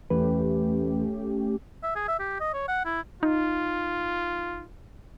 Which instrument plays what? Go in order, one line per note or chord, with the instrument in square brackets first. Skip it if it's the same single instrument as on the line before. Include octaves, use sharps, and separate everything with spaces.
[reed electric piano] E2 E3 B4 [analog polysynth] A3 C#4 G4
[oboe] E5
G#4
E5
G4
D#5
C#5
F#5
E4
[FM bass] D#4 [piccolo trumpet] F4